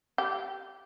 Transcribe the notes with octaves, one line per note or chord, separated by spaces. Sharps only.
G4